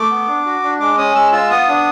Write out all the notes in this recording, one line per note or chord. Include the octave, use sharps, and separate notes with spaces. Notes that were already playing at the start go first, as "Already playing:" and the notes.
Already playing: A3 D6
B3
D4
F#4
D4
G#3 D6
C#4 D#6
G#3 E6
F4 E6
B3 D#6
D4